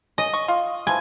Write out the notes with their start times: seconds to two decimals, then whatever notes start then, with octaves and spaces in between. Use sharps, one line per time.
0.18 C#4 D#5
0.34 C#6
0.48 F4
0.87 E3 F3 G#5